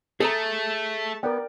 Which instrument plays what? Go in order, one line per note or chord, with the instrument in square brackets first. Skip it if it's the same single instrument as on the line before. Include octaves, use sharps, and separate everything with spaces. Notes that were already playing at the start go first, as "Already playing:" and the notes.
[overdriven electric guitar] A3 [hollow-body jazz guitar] G#4 A4 A#5 [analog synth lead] A5
[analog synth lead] B3 [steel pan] A#4 D5 G5